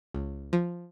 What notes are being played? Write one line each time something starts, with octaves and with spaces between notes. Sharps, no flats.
C#2
F3